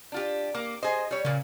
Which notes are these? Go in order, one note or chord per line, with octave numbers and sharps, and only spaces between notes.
D4 F4 G4
A#3 D6
G#4 C5 D#5
G3 C#5
A#2 C#3 A#3